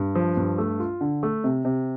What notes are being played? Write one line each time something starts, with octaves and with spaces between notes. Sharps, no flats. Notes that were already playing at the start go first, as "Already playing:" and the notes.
Already playing: G2
F3
G2
A3
F4
D3
A3
C3
C3